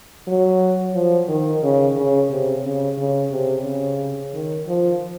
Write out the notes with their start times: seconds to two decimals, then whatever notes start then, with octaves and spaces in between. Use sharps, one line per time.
0.27 F#3
0.95 F3
1.29 D#3
1.63 C#3
1.97 C#3
2.30 C3
2.65 C#3
2.98 C#3
3.32 C3
3.65 C#3
4.33 D#3
4.68 F3